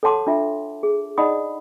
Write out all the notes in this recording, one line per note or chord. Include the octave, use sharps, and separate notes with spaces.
A4 C#5 F#5 A5 C6 D6
D4 F4 E5
G#4
D#4 D5 D#5 F#5 B5 D#6